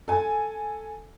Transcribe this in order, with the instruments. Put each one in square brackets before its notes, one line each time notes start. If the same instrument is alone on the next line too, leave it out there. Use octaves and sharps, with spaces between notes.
[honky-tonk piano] A4 G#5